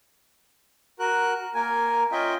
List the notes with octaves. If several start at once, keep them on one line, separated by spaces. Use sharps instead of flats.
F#4 A#4 F#6
A#3 A#4 G#5
C#4 F4 D#5 E5 G5